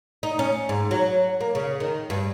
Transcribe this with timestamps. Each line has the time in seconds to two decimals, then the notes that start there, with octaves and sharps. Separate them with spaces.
0.23 D#4
0.39 C#4
0.69 G#2
0.91 F#3
1.41 A#3
1.55 C#3
1.80 D#3
2.10 G2